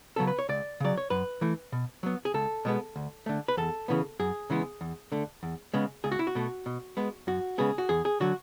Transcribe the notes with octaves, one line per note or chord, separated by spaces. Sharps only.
C#3 F#3 B3 A4
B4
C#5
C#2 D5
C#3 F#3 D5
C#5
F#2 B4
E3 A3
B2
F#3 B3
G#4
C#2 A4
B2 G#3 B3
D2
D3 A3
B4
E2 A4
C#3 E3 B3
F#2 G#4
C#3 E3 G#3 B3
E2
D3 A3
E2
C#3 G#3 B3
C#2 G#4
F#4
E4
F#4
B2 A3
B2
G#3 B3
F#2 F#4
C#3 G#3 B3 G#4
F#4
E2 G#4
G#4
D3 F#3 F#4